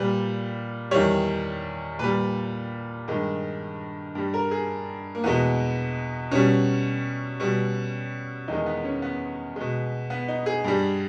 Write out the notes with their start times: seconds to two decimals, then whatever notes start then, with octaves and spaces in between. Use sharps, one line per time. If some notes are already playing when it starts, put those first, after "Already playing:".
Already playing: A#2 G3 B4
0.91 E2 D#3 G3 C#5
1.99 A#2 G3 B4
3.08 G2 D#3 G#3
4.15 G2 G3
4.34 A#4
4.51 G#4
5.15 A#3
5.24 E2 B2 G#3 B3
6.31 B2 G3 C#4
7.40 B2 G3
8.48 E2 D#3 G#3 D#4
8.66 B3
8.84 C#4
9.02 B3
9.56 B2 G#3
10.10 B3
10.28 D#4
10.46 G#4
10.64 G2 G3